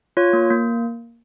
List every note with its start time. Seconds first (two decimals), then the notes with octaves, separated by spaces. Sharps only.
0.17 F4 C#5
0.33 A#3
0.50 A#3